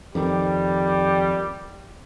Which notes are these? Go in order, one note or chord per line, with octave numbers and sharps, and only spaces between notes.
F2 D#3 G3